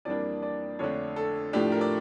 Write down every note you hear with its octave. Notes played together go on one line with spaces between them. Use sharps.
F2 E3 G3 A#3 D4 D5
D5
F2 D3 A3 D4 C#5
A4
A2 F3 A3 D4 G4
A#4
D5